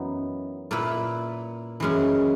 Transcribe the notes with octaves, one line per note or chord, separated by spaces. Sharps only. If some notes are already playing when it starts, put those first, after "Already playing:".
Already playing: F#2 E3 B3 D#4
A#2 A#3 E4 B4
F#2 E3 G#3 C#4